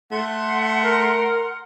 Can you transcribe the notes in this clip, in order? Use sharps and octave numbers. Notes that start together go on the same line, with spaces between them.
A3 F#5 C6
A#4